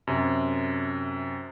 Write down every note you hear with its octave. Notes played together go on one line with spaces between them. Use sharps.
F#2 C3